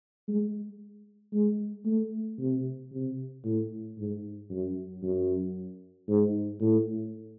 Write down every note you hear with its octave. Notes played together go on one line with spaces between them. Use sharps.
G#3
G#3
A3
C3
C3
A2
G#2
F#2
F#2
G#2
A2